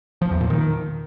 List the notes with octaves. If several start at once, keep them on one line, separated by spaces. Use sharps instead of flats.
F3
E2
A#2
D#3